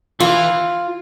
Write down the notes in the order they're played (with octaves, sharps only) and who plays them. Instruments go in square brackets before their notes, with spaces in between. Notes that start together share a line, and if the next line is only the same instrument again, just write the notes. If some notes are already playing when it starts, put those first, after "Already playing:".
[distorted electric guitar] E3 [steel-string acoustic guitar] F4